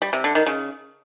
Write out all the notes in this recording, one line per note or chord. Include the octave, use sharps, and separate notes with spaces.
G3
C3
D3
D#3
C#3